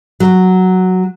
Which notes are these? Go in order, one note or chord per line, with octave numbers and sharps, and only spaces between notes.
F#3